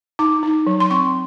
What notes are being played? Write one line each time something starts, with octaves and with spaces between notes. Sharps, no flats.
D#4 D6
D#4
F#3
C6
C4 C#6